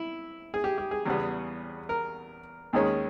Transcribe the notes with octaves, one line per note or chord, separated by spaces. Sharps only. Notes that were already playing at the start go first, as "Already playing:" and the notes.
Already playing: E4
G#4
G4
G4
G#4
E2 C#3 G3 B3
A#4
D#2 D#3 G#3 C#4